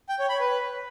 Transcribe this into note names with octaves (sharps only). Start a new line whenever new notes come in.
G5
C#5
B5
B4